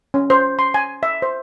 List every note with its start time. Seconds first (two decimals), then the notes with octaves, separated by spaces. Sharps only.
0.14 C#4
0.30 C5
0.59 C6
0.74 G#5
1.03 E5
1.22 C5